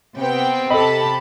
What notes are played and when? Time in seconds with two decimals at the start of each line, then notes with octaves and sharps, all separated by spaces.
0.19 C3 B3 C4 G5
0.70 C3 G4 A4 D#5 A5 B5